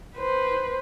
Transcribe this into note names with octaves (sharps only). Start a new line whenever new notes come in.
B4 C5